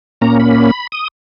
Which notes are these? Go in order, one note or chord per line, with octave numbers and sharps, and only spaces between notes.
A#2 A#3 C#4 A#5
B5
D#6